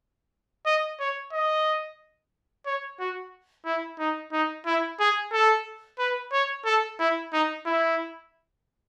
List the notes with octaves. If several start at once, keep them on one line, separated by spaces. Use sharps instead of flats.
D#5
C#5
D#5
C#5
F#4
E4
D#4
D#4
E4
G#4
A4
B4
C#5
A4
E4
D#4
E4